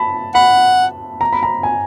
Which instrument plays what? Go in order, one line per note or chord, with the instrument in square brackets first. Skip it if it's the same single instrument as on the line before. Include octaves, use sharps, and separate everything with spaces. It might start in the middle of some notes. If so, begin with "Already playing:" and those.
Already playing: [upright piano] A5 B5
[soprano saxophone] F#5 [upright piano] B5
[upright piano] A#5
B5
A#5
G#5